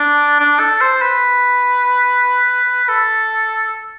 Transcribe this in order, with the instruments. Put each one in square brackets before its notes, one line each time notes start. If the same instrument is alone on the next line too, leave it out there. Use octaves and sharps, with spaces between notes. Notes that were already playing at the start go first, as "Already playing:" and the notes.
Already playing: [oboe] D4
D4
A4
C5
B4
A4